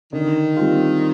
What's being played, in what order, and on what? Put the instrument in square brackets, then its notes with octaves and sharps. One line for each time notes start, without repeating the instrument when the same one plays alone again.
[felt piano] D3 [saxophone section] D#3
[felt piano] G3 C4 F4